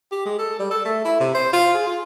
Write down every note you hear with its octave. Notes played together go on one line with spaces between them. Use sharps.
G4
G#3
A4
G3
A4
A3
E4
C3
C5
F4
G#4
F4